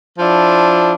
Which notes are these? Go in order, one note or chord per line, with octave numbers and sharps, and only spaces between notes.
F3 D4 E4